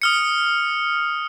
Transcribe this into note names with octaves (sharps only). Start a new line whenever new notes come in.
D#6 F6 C#7